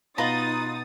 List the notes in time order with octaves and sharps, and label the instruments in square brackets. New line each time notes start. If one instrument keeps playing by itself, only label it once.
[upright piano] B2 [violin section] D#4 D#6 A6 [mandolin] F4 B4 A#5